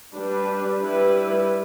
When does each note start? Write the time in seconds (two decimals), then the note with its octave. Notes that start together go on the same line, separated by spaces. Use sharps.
0.15 G3 D4 B4
0.82 G3 E4 B4